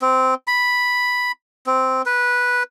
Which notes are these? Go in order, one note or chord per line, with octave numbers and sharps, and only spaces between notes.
C4
B5
C4
B4